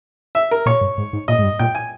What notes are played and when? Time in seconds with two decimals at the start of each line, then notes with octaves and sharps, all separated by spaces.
0.35 E5
0.51 A#4
0.66 A#2 C#5
0.81 G2
0.98 G#2
1.13 G#2
1.28 A#2 D#5
1.39 G#2
1.43 G2
1.59 A#2 G5
1.75 G#5